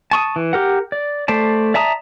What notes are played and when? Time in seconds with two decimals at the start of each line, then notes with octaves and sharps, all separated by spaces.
0.11 A5 C#6 D#6
0.36 E3
0.53 G4 A#4 F#5
0.92 D5
1.28 A3 C5 D5 A5
1.74 D5 E5 A5 A#5 D#6